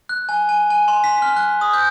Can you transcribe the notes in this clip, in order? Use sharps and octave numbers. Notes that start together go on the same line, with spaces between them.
F#6
G#5
G#5
G#5
C6
B6
F6
F#6
D#6
G6